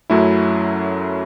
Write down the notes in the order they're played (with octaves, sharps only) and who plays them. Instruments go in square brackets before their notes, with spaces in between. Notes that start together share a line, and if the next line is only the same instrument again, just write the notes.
[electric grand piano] F#2 F#3 A3 C#4 E4